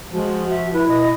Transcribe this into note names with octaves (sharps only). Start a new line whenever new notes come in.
F3 G#3 F#4
E5
E4 B4
B2 D#5